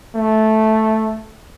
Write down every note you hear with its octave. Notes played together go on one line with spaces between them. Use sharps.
A3